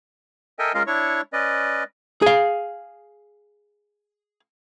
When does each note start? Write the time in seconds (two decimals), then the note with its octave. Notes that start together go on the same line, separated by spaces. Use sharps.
0.59 A4 A#4 D#5 E5 G5 G#5
0.74 G#3 C#4 F4 A#4 D#5 F5
0.87 D4 E4 C#5 C#6
1.33 C#4 B4 D5 D#5
2.22 G#4 F5